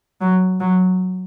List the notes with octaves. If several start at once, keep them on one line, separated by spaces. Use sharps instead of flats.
F#3
F#3